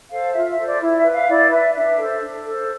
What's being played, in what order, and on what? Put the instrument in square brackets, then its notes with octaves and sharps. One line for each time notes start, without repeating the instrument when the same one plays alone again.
[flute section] A4 C5 F5
F4 E5
E5
A4 C5
D5
E4
E5
B4
F5
E4 D5
B4 E5
D4 E5
A4 C5
D4
A4 C5